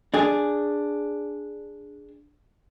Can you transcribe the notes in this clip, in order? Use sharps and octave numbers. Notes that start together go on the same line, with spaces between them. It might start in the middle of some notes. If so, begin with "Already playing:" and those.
D4 G#4